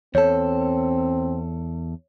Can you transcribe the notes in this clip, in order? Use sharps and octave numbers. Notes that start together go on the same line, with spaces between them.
E2 C4 A4 C#5